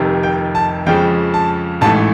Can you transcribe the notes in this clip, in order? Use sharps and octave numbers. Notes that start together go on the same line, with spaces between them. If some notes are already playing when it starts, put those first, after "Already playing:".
Already playing: F1 F2 C3 D#3
G5
A5
F2 C#3 F3 G#3 G5
A5
A1 G#2 E3 A3 A5